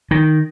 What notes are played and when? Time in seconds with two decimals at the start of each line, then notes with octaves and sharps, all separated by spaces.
0.11 D#3